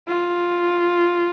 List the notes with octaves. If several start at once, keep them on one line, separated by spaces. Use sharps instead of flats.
F4